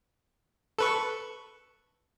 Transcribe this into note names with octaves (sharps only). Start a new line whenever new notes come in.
A4 B4 C#6